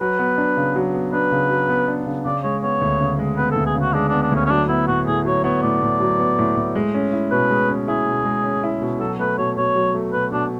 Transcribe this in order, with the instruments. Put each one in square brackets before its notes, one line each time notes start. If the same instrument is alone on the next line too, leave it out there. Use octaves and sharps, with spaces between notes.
[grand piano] F#3 [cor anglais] B4
[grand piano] B3
D4
C#3
F#3
B3
[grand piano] D4 [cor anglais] B4
[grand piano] C#3
F#3
B3
D4
C#3
[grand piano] C#3 [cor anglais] D5
[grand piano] G#3 [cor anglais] C#5
[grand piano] B3 [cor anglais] C#5
[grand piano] D2
C#3
G#3
[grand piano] B3 [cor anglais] B4
[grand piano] D2 [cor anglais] A4
[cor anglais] G#4
[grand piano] C#3
[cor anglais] F#4
[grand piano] G#3 [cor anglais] D4
[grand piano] B3 [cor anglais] D4
[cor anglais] D4
[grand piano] D2 [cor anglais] C#4
[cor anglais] C#4
[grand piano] F#3 [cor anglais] D4
[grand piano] B3 [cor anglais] E4
[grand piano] A2 [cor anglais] F#4
[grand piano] A2 [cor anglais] G#4
[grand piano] F#3 [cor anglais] C#5
[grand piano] B3 [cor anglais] C#5
[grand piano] A2 [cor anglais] D5
[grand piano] A2
F#3
B3
A2
A2
G#3
C#4
E4
[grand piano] B2 [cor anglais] B4
[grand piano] G#3
C#4
[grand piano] E4 [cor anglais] G#4
[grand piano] B2
G#3
C#4
E4
B2
[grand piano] F#3 [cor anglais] A4
[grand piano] A3 [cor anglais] B4
[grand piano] B2 [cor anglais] C#5
[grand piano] B2 [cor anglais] C#5
[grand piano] F#3
A3
[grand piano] B2 [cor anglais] B4
[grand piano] B2 [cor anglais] D4